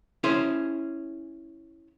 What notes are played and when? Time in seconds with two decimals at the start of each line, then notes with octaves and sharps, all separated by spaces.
0.24 C#4 E4 G#4 C5